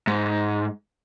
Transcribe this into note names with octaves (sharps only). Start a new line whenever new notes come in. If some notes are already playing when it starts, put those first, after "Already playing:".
G#2